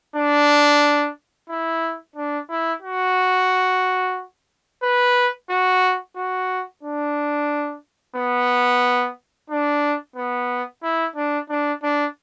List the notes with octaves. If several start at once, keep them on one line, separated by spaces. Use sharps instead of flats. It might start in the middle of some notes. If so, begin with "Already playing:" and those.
D4
E4
D4
E4
F#4
B4
F#4
F#4
D4
B3
D4
B3
E4
D4
D4
D4